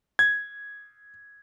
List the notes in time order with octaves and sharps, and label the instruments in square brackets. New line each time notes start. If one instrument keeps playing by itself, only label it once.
[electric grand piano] G#6